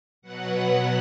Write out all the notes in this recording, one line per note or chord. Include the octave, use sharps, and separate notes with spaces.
B2 F#3 B3 F#5